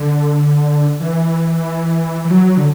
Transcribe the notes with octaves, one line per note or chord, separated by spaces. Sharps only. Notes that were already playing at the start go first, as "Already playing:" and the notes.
Already playing: D3
E3
E3
F#3
D3